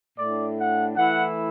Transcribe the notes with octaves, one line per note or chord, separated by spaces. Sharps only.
A2 A3 D4 D5
F#5
E3 A3 E4 F#5